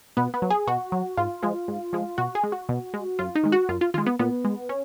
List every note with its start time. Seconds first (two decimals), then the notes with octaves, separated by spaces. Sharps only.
0.17 B2 B3
0.34 B3
0.42 F#3
0.50 G#4
0.67 B2 F#4
0.92 F#3
1.17 G#2 F4
1.43 F3 G#3
1.68 G#2
1.93 F3 G#3
2.18 B2 F#4
2.35 G#4
2.43 G#3
2.52 F#4
2.69 B2
2.94 G#3
3.19 F#2 F4
3.35 D#4
3.43 D#3 G#3
3.52 F#4
3.69 F#2 F4
3.81 F4
3.94 D#3 G#3 F4
4.06 B3
4.19 A#2 B3
4.45 G#3
4.69 C#4